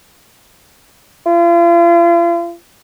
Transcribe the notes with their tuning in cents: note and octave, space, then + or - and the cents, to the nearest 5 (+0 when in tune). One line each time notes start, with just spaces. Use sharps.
F4 -40